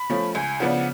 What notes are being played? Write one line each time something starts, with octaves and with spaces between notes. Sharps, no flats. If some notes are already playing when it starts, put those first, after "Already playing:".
Already playing: B5
F3 A3 C#4
C#2 G#5
C#3 F3 B3 D4 F#5